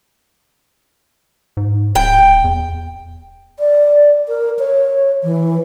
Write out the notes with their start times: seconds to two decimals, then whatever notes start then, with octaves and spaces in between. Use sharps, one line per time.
1.57 G#2
1.95 D1 G5
2.44 E2
3.59 D5
4.28 A#4
4.59 C#5
5.23 E3